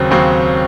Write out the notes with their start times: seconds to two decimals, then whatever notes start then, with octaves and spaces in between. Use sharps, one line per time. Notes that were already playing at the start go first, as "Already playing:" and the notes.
Already playing: D#2 C#3 F#3 C4
0.11 D#2 C#3 F#3 C4